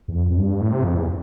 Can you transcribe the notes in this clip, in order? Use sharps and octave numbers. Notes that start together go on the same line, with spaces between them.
E2
F2
F2
G2
A2
C3
F2
E2